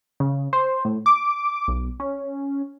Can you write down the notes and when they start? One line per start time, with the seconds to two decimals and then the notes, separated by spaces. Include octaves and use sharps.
0.20 C#3
0.53 C5
0.85 A2
1.06 D6
1.68 B1
2.00 C#4